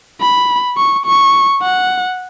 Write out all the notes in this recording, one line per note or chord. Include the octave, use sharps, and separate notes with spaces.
B5
C#6
C#6
F#5